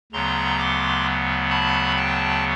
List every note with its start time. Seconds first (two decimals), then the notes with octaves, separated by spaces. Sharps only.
0.12 D2 C#3 F#3 B3 A#5 C6
0.59 C6 D6
1.50 A5 B5
1.97 G5 A5